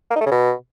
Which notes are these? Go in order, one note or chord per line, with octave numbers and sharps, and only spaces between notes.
A#3
D#4
A3
C#3
B2